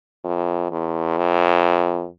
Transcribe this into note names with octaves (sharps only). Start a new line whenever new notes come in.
F2
E2
F2